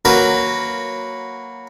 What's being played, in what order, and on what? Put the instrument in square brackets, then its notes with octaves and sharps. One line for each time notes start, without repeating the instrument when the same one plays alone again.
[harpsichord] F#3 A#3 F#4 A#4 B4 C#5